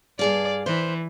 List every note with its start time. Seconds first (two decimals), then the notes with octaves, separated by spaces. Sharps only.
0.19 G2 G#4 D5 F5
0.66 E3 C5